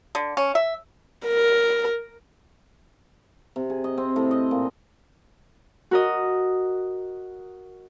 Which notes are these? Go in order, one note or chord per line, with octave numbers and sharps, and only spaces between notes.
D3
C#4
E5
A#4
C3
G#4
D#5
C4
A2
D#5
A#2
F#4 A#4 D#5